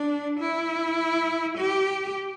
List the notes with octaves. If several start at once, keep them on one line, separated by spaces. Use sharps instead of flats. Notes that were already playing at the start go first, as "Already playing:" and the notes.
Already playing: D4
E4
G4